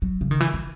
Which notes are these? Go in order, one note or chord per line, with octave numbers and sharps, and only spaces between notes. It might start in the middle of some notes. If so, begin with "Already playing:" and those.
F#3
C#3
D#3
E3
E3